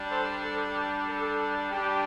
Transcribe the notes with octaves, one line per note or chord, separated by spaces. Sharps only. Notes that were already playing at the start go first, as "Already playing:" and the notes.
Already playing: G3 D4
A4 C5
A4
A4
G3 D4 G4